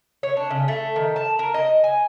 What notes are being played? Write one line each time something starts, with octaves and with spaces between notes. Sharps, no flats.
C#5
D4
C#3
A3
D#3
A5
A#4
D#5
G#5